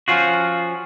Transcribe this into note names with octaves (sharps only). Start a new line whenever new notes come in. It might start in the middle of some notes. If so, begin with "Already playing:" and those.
F3 C#4 F4 F#4